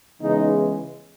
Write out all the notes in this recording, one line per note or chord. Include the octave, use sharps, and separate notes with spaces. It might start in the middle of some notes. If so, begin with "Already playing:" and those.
C#3 E3 G#3 B3 D#4